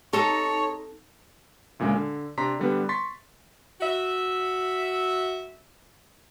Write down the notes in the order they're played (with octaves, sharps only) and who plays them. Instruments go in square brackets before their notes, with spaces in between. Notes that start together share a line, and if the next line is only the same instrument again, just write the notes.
[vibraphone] C4 D#4 [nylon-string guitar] A4 [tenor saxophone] C#5 [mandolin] D#5 A5 A#5
[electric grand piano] D2 A#2 C#3 G#3
D3
C3 D4 A#5 C6 B6
D3 G3 B3 B4
C6 C#6 A6 B6
[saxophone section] F#4 E5